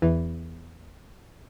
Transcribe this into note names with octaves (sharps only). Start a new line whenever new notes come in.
E2 E3